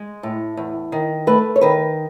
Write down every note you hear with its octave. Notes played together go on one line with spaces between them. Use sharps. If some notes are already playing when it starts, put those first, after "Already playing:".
Already playing: G#3
A2
E2
D#3
A3 B4
C#5
D#3 B4